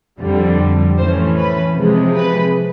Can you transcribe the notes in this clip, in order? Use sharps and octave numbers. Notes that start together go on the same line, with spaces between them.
F2 D3 G3
A2 E3 A3 C#4 C5
B4
C3 F3 G#3
B4